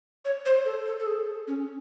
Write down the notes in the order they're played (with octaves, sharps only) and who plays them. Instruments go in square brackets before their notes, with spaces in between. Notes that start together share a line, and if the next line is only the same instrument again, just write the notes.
[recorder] C#5
C5
A4
A4
A4
G#4
C#4